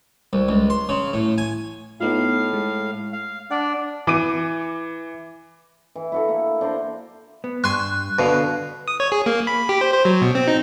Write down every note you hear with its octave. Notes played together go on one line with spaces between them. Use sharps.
C2
C#2
C6
C#3
A2
G#5
A2 B3 D#4 F4 F5
G#3
F5
D4 D5 F#5
E3 D6 D#7
E3
E4 F#4 A4
A#3
D4 C5 D5 A#5
B3
G2 G#5 C6 C#6 F#6
B2 D3 B4 F5
D#6
C#5
G#4
A#3
B5
G4
C5
C5
F#3
B2
C4
D#4